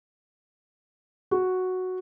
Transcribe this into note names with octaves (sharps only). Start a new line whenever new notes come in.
F#4